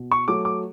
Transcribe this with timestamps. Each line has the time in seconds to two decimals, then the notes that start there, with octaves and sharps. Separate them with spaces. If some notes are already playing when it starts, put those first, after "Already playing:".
Already playing: B2
0.11 C#6
0.28 F#3 A3 D6
0.45 D6